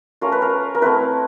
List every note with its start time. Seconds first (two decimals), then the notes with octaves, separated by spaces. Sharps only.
0.21 A3 C#4 F4 A#4
0.32 B4
0.42 A#4
0.75 A#4
0.82 A3 C4 E4 B4